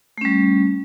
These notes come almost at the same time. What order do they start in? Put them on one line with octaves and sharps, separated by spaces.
A3 C#4 G3